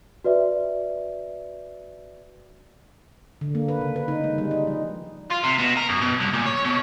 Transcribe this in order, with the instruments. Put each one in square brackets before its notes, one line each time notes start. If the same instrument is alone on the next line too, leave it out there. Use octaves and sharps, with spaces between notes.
[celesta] F#4 B4 D5 E5
[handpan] D3
A#3
B4
C#3
B4
D#4
G#3
G3
D#4
F3
[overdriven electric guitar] F4
C3
B2
A#4
F#2
B2
C2
A#2
C#5
B2